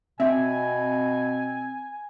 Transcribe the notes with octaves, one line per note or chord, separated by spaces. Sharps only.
B2 C4 E5 G#5